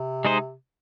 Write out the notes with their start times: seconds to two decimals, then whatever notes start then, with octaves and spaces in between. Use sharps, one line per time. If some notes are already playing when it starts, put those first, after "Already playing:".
Already playing: C3
0.25 G#3 D#4 G#4 C5